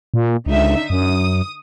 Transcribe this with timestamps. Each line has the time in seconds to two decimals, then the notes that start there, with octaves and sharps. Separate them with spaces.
0.14 A#2
0.46 C#2 D3 D#4 E5
0.90 F#2 D#6